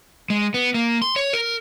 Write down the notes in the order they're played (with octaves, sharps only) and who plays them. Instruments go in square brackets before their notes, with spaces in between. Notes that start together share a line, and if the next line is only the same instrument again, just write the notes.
[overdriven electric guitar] G#3
B3
A#3
C6
C#5
A#4